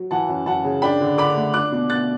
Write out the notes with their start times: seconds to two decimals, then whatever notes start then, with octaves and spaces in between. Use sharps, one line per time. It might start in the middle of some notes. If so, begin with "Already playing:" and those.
Already playing: F#3
0.11 E3 F#5 A5
0.29 F#2
0.46 F#2 F#5 A5
0.64 C#3
0.82 D4 G5 B5
1.01 D3
1.18 D3 B5 D6
1.36 A3
1.54 D4 D6 F#6
1.72 B2
1.89 B2 F#6 A6